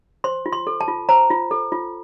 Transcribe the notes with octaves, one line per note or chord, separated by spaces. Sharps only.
C5 C6
F4
C6
A4
A5
F4
C5 A#5
F4
A4
F4